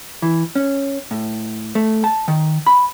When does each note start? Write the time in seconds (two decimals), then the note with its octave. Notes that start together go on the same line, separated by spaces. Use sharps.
0.22 E3
0.55 C#4
1.11 A2
1.75 A3
2.04 A5
2.28 D#3
2.66 B5